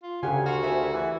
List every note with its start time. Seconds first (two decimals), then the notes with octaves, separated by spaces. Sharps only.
0.03 F4
0.23 D2 C#3 G4 F5 F#5 G#5
0.46 F#4 C6 F6
0.63 G4 A#4 C5 E5 G#5
0.93 E3